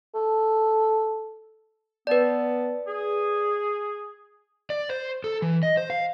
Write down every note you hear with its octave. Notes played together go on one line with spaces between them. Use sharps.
A4
B3 B4 D5 A5
G#4
D5
C5
A4
E3
D#5
C5
F5